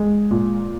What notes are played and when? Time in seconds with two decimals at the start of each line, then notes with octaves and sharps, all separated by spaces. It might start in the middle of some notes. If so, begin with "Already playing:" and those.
Already playing: G#3
0.31 A#2